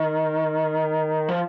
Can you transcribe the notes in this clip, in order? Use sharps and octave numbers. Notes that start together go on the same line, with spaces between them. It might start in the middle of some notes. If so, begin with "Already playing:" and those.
Already playing: D#3
F3